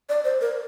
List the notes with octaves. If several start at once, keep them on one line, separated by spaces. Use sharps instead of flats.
D5
C5
A#4